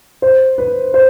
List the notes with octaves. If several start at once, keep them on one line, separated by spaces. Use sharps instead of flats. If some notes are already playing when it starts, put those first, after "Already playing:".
C5
B4
C5